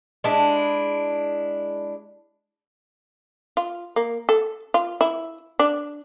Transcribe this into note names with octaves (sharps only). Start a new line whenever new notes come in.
G#3 D4 E4
F4
A#3
A4
F4
E4
D4